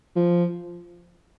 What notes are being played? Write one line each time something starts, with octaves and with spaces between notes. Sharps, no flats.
F3